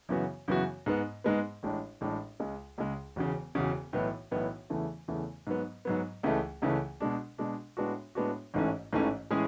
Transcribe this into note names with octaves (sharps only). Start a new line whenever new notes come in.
F#2 C#3 E3 B3 F#4
F#2 C#3 E3 B3 F#4
G#2 G#3 B3
G#2 G#3 B3
A1 A2 G#3 D4
A1 A2 G#3 D4
C#2 C#3 G#3
C#2 C#3 G#3
E1 E2 C#3
E1 E2 C#3
B1 A2 E3 B3
B1 A2 E3 B3
E2 C#3 E3 A3
E2 C#3 E3 A3
G#2 F#3 B3
G#2 F#3 B3
C#2 C#3 E3 A3
C#2 C#3 E3 A3
B2 G#3 D4
B2 G#3 D4
A2 G#3 B3 D4 F#4
A2 G#3 B3 D4 F#4
A1 G#2 E3 A3 C#4
A1 G#2 E3 A3 C#4
A2 E3 G#3 C#4 G#4